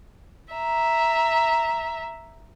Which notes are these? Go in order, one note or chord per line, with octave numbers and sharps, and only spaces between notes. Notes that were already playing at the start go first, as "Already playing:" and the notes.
E5 A#5